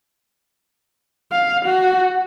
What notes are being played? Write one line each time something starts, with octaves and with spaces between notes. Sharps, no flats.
F5
F#4